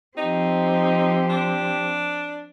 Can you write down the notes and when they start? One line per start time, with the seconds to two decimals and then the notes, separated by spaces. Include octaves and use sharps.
0.17 F3 C4 D#4 G4
1.30 D4